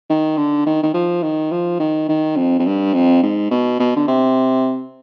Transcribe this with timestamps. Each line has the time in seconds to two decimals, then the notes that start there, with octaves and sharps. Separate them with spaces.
0.10 D#3
0.37 D3
0.66 D#3
0.83 D#3
0.94 F3
1.23 D#3
1.52 F3
1.80 D#3
2.09 D#3
2.37 F2
2.59 F2
2.66 G2
2.93 F2
3.23 G#2
3.51 B2
3.79 B2
3.96 D3
4.08 C3